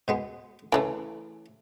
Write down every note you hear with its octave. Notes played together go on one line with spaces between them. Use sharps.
B2 G#3 B3
C#3 E3 F#3 A3 D6